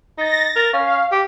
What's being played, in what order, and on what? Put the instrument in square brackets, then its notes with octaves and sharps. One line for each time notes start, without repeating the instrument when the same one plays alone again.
[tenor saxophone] D#4 [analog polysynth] A6 A#6
[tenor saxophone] A#4
[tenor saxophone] C#4 [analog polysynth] F5
[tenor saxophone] G4